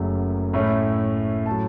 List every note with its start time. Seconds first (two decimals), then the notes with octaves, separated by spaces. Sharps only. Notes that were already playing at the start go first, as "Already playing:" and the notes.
Already playing: F#1 F#2 F#3 A3
0.53 A2 A3 C#4 E4
1.46 A2 F#3 A5